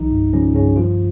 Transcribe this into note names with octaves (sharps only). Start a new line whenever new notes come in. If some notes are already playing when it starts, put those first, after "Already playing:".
Already playing: C2 D#3 F3 D#4
G2
C#3 F3 C#4
G2 C#3 C#4
D#3 F3 F4